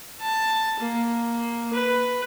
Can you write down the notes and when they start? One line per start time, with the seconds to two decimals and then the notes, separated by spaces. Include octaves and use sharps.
0.21 A5
0.79 A#3
1.74 B4